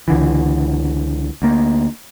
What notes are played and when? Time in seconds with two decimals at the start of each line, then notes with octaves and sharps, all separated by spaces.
0.08 C#2 D3 E3
1.42 D2 A#3